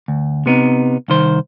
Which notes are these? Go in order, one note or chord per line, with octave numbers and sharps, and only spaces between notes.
D2
C3 B3 D#4
C2 D#3 C5